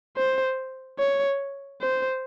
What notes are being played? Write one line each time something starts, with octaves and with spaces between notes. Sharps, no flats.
C5
C#5
C5